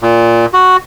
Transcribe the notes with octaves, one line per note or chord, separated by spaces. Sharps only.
A#2
F#4